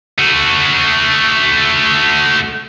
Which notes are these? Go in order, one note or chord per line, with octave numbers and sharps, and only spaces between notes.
A3 F#4